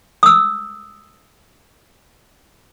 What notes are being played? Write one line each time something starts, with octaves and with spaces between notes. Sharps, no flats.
D#6 E6